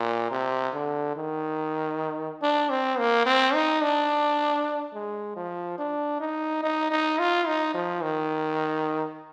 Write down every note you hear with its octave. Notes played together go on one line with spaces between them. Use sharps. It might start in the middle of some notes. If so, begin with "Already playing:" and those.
Already playing: A#2
C3
D3
D#3
D4
C4
A#3
C4
D#4
D4
G#3
F3
D4
D#4
D#4
D#4
F4
D#4
F3
D#3